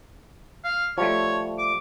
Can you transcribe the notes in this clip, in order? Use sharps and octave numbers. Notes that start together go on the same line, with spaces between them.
F5
F3 G3 A3 C#5
D6